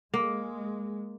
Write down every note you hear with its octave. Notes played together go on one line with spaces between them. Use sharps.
G#3 A#3